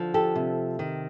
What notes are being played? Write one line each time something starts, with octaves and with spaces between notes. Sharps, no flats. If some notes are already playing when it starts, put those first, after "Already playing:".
Already playing: D3 F3
G4 A4
C3
D#3